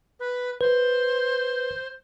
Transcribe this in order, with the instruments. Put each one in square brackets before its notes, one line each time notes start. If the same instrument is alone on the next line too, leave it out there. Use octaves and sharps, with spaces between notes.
[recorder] B4
[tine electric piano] B4 [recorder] C5